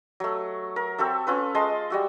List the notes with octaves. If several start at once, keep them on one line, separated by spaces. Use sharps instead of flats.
F#3 A3
A#4
C4 F#4 A4 E5
C#4 F4 B4
G#3 D#5 A5 C6
G3 F#4 E5